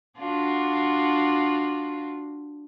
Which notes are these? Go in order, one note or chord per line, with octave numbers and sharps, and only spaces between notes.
D4 F4 F#4